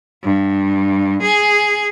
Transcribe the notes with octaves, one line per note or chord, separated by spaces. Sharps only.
G2
G#4